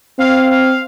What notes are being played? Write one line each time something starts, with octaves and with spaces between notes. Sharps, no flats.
C4 F5
F5